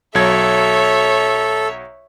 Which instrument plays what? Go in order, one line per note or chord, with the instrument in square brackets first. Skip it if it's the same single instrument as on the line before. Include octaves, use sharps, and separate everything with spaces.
[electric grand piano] B1 F#3 G#6 [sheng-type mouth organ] A4 [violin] C#5 E5